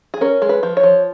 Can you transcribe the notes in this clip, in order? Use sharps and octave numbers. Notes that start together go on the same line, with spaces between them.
G#4
C#4 A#4
G#3
B4
F3
C#5
F3